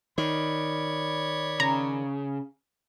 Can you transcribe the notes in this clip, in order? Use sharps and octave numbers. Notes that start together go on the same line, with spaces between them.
D#3 C#5 D5 B5
C#3 A#5